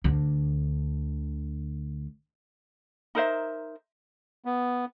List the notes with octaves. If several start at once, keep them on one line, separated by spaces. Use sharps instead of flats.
D2 D3
D#4 A#4 C5 E5
B3